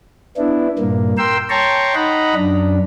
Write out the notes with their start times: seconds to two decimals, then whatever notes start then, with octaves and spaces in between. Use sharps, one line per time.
0.37 B3 D4 E4
0.79 G2 A#2 A#3
1.18 A#4 G5 C6 E6
1.50 C#5 G5 A5 A#5 C6 C#6
1.95 D#4 D#5 F#5 A#5 B5
2.35 F#2 D4